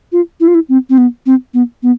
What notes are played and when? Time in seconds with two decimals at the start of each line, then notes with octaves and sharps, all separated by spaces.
0.12 F4
0.40 E4
0.48 F4
0.55 E4
0.69 C4
0.90 C4
0.98 B3
1.26 C4
1.54 B3
1.83 B3